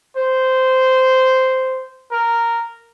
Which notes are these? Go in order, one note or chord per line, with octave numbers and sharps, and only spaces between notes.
C5
A#4